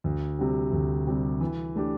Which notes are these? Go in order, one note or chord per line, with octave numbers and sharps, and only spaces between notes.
D2
C3 G3
D2
C3 G3
E3
A3 D4 G4